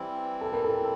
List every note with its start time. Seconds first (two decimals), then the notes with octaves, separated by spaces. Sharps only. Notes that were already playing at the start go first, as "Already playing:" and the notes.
Already playing: E3 G3 C4 E4
0.41 A4
0.53 A#4
0.64 A4